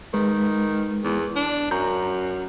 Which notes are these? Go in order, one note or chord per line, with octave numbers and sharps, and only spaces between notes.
D#3 G#3 B4
E2
D4
F#2 A#5 G6